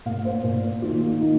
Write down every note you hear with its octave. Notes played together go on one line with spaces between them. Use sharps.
A#2 A#3 F5
C5
A#2 A#3
D#3 A#3 F4
F4
D#3 A#3 D#4